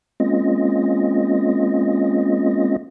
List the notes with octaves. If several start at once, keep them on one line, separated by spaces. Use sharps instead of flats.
G#3 A#3 C4 C#4 F4 D#5